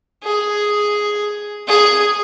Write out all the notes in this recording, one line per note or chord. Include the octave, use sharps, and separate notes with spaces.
G#4
G#4